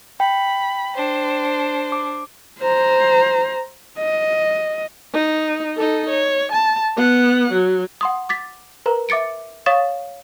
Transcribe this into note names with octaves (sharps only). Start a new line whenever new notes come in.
G5 B5
D4 C5
D6
C5 A#5
D#5
D#4
D#4 A4
C#5
A5
B3 F#5
F#3
F#5 C6 D#6
D6 A6 B6
A#4 B4 A#5
E5 D6 A6 C#7 D7
C#5 F5 C#6 D#6 A6 E7